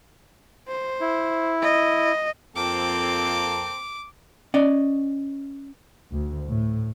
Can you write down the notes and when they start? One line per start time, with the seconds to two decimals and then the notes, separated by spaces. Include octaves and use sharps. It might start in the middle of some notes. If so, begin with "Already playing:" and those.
0.68 C5
1.01 E4
1.62 D#5
2.56 F2 A#3 C4 A4 D6
4.54 C#4 D5 D#5
6.12 D2
6.47 A2